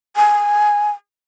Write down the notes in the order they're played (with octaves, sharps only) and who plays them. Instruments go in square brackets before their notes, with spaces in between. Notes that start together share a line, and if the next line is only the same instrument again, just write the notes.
[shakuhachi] G#5